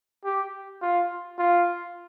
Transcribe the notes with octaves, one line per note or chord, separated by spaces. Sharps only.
G4
F4
F4